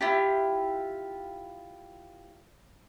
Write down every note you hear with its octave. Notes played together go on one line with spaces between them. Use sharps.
E4 F4 G4